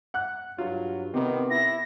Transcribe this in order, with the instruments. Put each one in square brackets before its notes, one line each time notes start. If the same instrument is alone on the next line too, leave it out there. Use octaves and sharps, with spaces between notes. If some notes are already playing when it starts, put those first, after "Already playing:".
[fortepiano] F#5 F#6
[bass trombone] G2 [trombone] F#3 [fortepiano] F4
[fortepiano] C3 [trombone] D#3 [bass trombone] B3
[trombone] E4 [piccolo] A#6